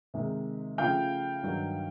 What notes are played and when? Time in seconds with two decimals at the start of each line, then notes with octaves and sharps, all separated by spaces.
0.14 C3 D#3 G#3
0.78 C#3 F3 A3 F5 G5
1.43 G2 D#3 F#3